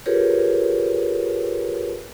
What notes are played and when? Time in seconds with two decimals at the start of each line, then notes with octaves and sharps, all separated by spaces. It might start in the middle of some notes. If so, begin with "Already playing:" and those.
0.06 F4 G4 G#4 A#4 B4 C#5